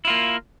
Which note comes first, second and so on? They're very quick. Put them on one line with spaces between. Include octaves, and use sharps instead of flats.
E4 F4 A#3